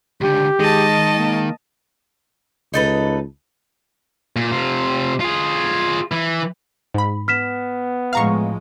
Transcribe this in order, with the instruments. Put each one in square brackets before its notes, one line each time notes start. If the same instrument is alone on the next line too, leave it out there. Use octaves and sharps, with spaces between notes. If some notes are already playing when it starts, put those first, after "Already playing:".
[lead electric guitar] C#2 D3 [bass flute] G4
[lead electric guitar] D#3 [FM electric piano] G#3 [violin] D#5 A5
[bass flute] A#3
[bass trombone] C#2 [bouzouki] D#4 A4 B4
[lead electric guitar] A#2
C3 F4
F4 G#4
E3
[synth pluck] G#2 B5
[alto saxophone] B3 [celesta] F6 B6 E7
[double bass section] A2 F3 G#3 [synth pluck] F5 A#5 C#6